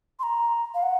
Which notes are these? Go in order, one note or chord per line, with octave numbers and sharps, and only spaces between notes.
C6
A#5
F5
F#5